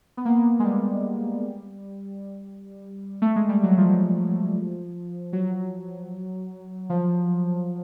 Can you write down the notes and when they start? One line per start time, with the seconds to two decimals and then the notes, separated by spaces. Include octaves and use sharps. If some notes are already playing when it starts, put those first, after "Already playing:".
0.17 B3
0.25 A#3
0.60 G#3
0.64 G3
3.22 A3
3.36 G#3
3.49 G3
3.63 F#3
3.77 F3
5.33 F#3
6.90 F3